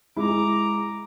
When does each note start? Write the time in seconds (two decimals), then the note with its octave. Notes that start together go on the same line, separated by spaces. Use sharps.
0.16 G#3 E4 A#5 D6